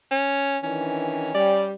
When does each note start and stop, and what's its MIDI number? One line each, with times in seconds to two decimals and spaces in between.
0.11 0.58 61
0.63 1.30 51
0.63 1.30 52
0.63 1.72 61
0.63 1.30 62
1.35 1.71 55
1.35 1.64 74